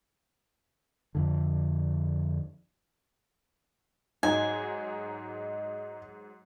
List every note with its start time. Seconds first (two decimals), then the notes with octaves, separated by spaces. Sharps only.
1.15 F2 D3
4.23 G#2 F#3 D#4 G#5